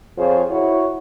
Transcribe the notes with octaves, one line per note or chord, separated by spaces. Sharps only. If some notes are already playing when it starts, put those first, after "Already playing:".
F2 F4 G#4 C5 C#5
E4 F#4 C#5